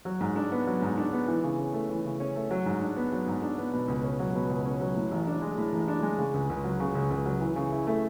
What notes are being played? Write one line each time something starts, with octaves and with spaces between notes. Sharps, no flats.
F#3
G#2
D4
B3
F#3
G#2
D4
B3
E3
C#3
C#4
A3
E3
C#3
C#4
A3
F#3
G#2
D4
B3
F#3
G#2
D4
B3
B2
C#2
C#4
F#3
B2
C#2
C#4
F#3
A2
A1
D4
G#3
A2
A1
D4
G#3
C#3
C#2
C#2
F#3
C#3
C#2
C#2
F#3
E3
C#3
E4
A3